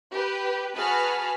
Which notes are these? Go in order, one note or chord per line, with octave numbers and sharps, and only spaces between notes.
G4 B4
F#4 G#4 B4 A5 B5 F6